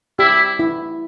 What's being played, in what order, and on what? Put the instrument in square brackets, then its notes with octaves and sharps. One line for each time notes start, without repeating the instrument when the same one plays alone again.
[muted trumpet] E4 [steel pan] G4
[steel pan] E4